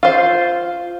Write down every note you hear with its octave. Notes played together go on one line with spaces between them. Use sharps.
F4 C5